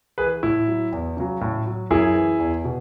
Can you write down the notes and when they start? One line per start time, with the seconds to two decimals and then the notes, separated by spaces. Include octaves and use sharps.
0.18 E3 G#4 B4
0.43 A2 E4
0.67 F#3
0.92 E2
1.17 C#3 F#3
1.41 A2
1.66 F#3
1.90 F#2 E4 G#4
2.15 E3
2.39 E2
2.64 B2